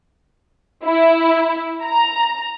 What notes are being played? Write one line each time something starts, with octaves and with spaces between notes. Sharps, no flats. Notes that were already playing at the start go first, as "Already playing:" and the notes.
E4
A#5